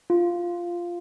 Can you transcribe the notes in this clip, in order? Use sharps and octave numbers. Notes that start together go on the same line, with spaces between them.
F4